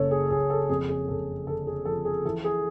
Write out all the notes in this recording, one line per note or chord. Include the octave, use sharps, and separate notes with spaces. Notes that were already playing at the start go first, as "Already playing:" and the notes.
Already playing: F#1 F#2 C#3 A4 C#5
G#4
F#1 G#4
A4
F2 G#4
G#4
F#1 A4
D3 A4
G#4
F3 A4
G#4
E3 A4
G#4